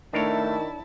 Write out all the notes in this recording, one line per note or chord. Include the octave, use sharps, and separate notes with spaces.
D#3 A3 D4 E4 A#4 C#5 A5